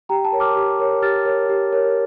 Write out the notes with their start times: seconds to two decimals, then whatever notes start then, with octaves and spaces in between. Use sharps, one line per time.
0.09 G4 G5 A#5
0.25 A5
0.32 A#4 C#5
0.40 D6 F6
0.56 G4
0.79 A#4 C#5
1.02 G4 F6 A6
1.25 A#4 C#5
1.49 G4
1.72 A#4 C#5